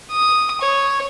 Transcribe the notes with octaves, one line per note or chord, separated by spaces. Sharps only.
D#6
C#5